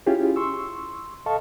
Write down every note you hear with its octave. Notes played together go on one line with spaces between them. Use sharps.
C#4 E4 F4 G4 G#4
C6 C#6 E6
A4 D#5 F5 A5 C#6